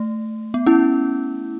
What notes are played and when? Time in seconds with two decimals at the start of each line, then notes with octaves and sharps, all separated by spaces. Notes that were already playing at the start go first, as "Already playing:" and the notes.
Already playing: A3
0.54 B3
0.66 C#4 E4